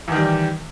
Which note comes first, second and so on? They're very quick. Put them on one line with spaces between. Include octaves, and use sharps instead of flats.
E2 D#3 G3